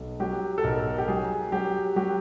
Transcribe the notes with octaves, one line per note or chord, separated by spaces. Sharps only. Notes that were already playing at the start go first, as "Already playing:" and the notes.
Already playing: B1
F#3 G4
A4
B1 A#4
G4
F#3 G#4
F#3 G4
F#3 G4